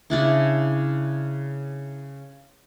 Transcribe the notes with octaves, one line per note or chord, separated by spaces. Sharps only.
C#3 D4 E4